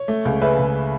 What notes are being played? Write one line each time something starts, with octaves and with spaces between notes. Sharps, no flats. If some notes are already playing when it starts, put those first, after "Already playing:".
Already playing: C#5
A3
C#2
C#3 B4 E5
C#2